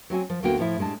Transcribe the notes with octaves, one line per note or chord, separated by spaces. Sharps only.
F#3 C4 F#4 G#5
F3
D2 D3 A#3 B3 F#4 G5
A2 F3 E4
A2 G3 G#3 D4 A5